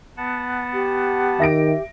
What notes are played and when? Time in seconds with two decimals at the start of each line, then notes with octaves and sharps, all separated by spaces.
0.17 B3 F#5 A5
0.73 G4
1.40 D#3 E5 A#6 D7